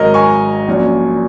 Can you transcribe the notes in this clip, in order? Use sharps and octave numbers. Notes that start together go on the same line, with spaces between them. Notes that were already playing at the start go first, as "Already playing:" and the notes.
Already playing: G#1 G#2 F#3 A#4 C#5 D#5
G#5 C#6
A#1 A#2 F#3 C#4